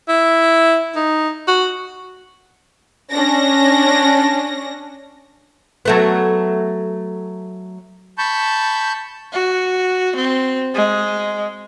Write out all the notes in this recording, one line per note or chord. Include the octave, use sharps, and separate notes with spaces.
E4
D#4
F#4
C#4 D4 A#6
F#3 A3 B3
A5 B5 C#6 G6
F#4
C4
G#3